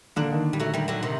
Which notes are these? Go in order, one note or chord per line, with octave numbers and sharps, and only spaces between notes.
D3 A#3 D4
D#3
G3
F#3 A3
D#3 G3
D3 F#3
C3 D#3